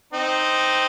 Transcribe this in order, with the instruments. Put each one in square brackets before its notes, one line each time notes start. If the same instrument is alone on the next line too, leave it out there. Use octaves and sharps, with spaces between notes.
[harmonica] C4 D#4